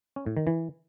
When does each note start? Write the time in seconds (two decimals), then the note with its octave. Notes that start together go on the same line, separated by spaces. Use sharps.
0.16 C#4
0.26 A2
0.37 D#3
0.47 E3